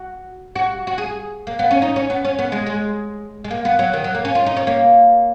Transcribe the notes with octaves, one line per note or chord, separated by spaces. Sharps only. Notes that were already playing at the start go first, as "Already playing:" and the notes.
Already playing: F#4
F#4
F#4
G#4
A#3
B3
C#4
D#4
C#4
B3
C#4
B3
G#3
G#3
G#3
A#3
B3
F#3
D#3
F#3
A#3
C#4
F4
D#4
C#4
A#3